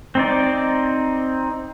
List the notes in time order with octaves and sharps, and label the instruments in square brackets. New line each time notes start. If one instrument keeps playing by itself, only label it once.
[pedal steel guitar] C4 D#4 D5